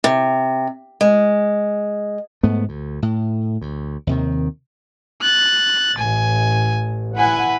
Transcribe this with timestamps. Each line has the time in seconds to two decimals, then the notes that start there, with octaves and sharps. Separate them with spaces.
0.04 C3
1.01 G#3
2.43 G#2 A3 B3
2.69 D2
3.02 A2
3.61 D2
4.07 D#2 C3 D#3
5.22 F#6 A6
5.98 A1 G#5
7.17 E4 B4 F#5 G#5